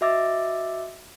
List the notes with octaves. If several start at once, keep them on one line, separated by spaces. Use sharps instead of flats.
F#4 D#5 E5 D6 E6 A6